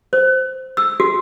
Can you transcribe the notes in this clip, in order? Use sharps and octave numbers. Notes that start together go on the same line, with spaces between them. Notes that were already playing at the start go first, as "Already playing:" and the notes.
C5
E6
F#4